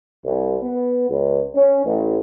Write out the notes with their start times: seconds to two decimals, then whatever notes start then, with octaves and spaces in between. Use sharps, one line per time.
0.24 C2
0.62 B3
1.09 C#2
1.56 C#4
1.85 A1